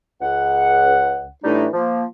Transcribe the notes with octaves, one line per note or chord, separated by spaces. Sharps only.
C#2 F#5
A2 E3 G3 A3 D4 D#4
F3 A#3